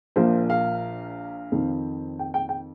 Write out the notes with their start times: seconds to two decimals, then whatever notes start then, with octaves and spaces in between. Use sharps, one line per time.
0.16 A#1 A#2 F3 A#3 C5
0.50 F5
1.52 F2 D#3 C4
2.19 G5
2.34 G5
2.49 G5